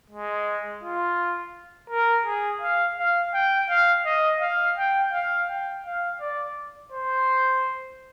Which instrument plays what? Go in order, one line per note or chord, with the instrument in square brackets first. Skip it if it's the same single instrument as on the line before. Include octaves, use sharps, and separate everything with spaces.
[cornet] G#3
F4
A#4
G#4
F5
F5
G5
F5
D#5
F5
G5
F5
G5
F5
D5
C5